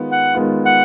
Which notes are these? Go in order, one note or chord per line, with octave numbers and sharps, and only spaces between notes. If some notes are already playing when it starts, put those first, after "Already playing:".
Already playing: D#3 G#3 B3 F4
F#5
D#3 G#3 B3 F4
F#5